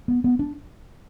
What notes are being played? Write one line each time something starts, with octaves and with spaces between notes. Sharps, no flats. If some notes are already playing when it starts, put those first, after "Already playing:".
B3
B3
D4